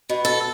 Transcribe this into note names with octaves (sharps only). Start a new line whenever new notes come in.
B2
A4